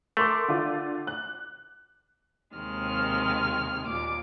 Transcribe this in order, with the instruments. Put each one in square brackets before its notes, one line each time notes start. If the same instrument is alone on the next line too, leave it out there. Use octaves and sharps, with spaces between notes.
[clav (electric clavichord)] A3 [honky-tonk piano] A#4 C6 D6
[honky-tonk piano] D3 F4
F#6
[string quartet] D#2 C3 D#3 G#3 F6
D#2 A#2 D6